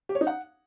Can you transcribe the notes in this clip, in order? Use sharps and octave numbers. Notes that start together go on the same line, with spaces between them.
G4
C#5
D#4
F#5